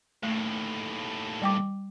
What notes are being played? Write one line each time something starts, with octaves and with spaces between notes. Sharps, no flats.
D#2 A2 A3
G3 G5 D6